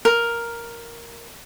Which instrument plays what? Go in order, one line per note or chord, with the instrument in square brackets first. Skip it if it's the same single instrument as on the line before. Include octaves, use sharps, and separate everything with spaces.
[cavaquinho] A#4